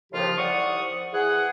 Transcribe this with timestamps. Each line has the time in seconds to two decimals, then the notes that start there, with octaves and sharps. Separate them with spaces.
0.13 D#2 A2 C#3 F3 F4 G4
0.38 C2 D5 F#5 C#6 D#6
1.14 E3 G#4 F#5